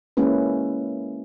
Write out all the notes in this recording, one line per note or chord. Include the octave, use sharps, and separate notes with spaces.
G#3 A#3 C#4 E4 B4